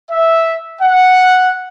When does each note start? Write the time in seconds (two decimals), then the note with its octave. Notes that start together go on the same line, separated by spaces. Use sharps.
0.11 E5
0.82 F#5